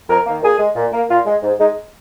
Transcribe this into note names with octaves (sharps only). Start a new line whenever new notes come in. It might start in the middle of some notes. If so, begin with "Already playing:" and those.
F2 A#4
D#3 A#3
A#2 G#4
G#3
A#2
A#3
A#2 F4
G#3
G#2
G#3 D#4